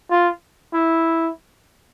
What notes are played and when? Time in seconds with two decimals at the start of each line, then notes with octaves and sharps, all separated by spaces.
0.11 F4
0.73 E4